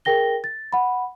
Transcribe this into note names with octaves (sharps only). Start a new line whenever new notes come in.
G#4 A#4 G5 A#6 G7
A6
F#5 B5